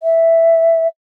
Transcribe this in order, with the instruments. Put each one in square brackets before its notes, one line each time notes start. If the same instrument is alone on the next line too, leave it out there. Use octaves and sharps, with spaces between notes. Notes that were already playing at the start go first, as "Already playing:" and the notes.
[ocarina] E5